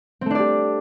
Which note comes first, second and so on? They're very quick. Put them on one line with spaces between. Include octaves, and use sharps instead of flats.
C4 A3 D4 D5 G4